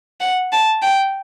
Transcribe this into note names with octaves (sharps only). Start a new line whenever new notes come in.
F#5
A5
G5